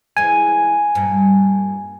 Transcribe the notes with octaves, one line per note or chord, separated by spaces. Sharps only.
E3 G#3 G#5
G2 A#2